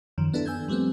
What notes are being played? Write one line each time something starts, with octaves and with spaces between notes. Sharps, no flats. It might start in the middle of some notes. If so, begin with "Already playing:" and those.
F#2 D#3 F3
B3 D4 E4 A4
G#5 E6 G6 G#6
F3 G3 A3 B3 C4